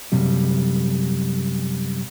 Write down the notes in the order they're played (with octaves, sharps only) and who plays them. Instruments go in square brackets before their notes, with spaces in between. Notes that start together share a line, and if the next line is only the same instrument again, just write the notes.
[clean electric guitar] F#2 C3 G3